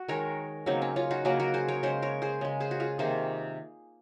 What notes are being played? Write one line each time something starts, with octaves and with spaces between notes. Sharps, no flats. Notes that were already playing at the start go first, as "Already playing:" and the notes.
Already playing: F#4
D#3 G#3 A#4 C#5
C#3 F#3 A#3 C4 D#4
C#4
C#4 F4
D#4 F#4
C#3 F#3 A#3 F#4 A#4
F#4 A#4
G#4 C5
A#4 C#5
C#3 G#3 C5 D#5
A#4 C#5
G#4 C5
C#3 G#3
G#4 C5
F#4
F4 G#4
C3 D#3 A#3 G#4 C5